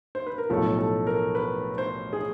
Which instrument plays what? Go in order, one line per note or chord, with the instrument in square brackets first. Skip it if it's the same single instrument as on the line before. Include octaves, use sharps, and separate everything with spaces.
[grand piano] C5
B4
A#4
B1 A2 F3 A4
A4
A#4
B4
C5
G#4